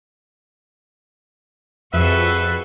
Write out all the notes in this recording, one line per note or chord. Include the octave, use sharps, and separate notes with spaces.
F2 F#4 G#4 A4 B4 E5